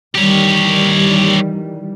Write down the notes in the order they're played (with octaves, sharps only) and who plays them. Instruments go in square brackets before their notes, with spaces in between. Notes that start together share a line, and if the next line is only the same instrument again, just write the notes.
[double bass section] D#3 E3 G3 [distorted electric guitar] G4 C#5